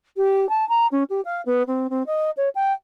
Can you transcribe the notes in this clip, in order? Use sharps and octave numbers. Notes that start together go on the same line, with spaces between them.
G4
A5
A#5
C#4
G4
F5
B3
C4
C4
D#5
C#5
G5